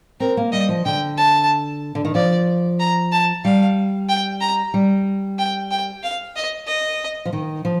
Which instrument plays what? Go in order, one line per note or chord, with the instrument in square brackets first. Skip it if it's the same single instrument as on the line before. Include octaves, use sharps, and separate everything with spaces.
[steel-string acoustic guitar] C4 [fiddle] A#4
[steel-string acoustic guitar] A#3
[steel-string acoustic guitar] G3 [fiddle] D#5
[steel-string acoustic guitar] F3
[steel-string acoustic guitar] D3 [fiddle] G5
[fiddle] A5
[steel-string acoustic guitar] D3
D#3
[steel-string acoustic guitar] F3 [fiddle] D5
[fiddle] A#5
A5
[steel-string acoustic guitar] G3 [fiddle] F5
[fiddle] G5
A#5
[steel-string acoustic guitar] G3
[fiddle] G5
G5
F5
D#5
D#5
[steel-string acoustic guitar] F3
D#3
F3